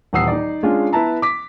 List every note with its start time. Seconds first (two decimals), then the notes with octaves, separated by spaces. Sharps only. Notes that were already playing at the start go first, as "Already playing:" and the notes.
0.13 D#1 E3 F#5 D#6 E6 C7
0.28 D#4 D5
0.63 G#3 C#4 D4 F4 G#4
0.93 B3 E4 B4 A5 A#5
1.22 D6 B6